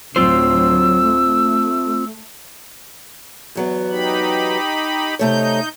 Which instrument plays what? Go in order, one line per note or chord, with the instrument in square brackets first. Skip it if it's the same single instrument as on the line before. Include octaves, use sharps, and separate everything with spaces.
[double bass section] D2 A2 F#3 [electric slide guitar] C4 F4 C5 [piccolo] E6
[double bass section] A3
[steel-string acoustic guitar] E2 F#3 B3
[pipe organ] D#4 G4 B5
[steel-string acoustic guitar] C3 A3 C#5 [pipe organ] D#4 G6